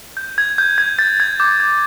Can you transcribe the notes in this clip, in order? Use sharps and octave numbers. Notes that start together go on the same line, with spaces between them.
G6
G#6
G6
G#6
G6 A6
G#6
D6 G6
G#6